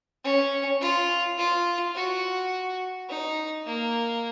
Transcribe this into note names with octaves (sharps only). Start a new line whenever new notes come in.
C#4
F4
F4
F#4
D#4
A#3